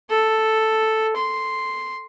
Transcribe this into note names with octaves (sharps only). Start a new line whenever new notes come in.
A4
C6